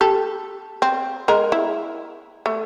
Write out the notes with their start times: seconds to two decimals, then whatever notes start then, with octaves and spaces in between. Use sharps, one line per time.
0.01 G4 A4
0.82 C4
1.28 G#3 A#4
1.52 E4
2.46 A3